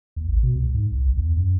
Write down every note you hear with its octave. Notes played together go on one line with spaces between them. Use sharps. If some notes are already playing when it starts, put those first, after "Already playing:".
D#2
A1
B2
C#2
G#2
C2
B1
E2
F#2